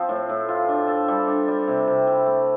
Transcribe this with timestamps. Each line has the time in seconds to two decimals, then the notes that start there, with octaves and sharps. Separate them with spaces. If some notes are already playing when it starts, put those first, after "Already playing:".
Already playing: F3 C4
0.09 A2
0.29 A2
0.49 F4
0.69 D4
0.87 A4
1.08 G3
1.28 D4
1.48 G3
1.68 C3
1.87 C3
2.07 E4
2.26 A3